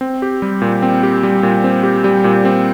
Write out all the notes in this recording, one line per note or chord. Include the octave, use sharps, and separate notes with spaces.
C4
G4
G3
A#2
C4
G4
G3
A#2
C4
G4
G3
A#2
C4